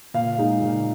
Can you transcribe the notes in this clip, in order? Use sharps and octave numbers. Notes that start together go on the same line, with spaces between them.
A#2 F5
G#3 D#4
A#2